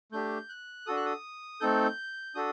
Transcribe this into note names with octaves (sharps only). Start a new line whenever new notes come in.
A3 D4 G4 G6
F#6
D4 F#4 A4 D#6
F#6
D#6
A3 C4 D#4 A4 G6
D4 F#4 A4 D#6